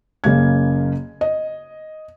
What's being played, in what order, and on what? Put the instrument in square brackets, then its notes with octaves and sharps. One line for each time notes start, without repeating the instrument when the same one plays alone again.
[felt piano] F#1 C#3 A#3 G#6
D#5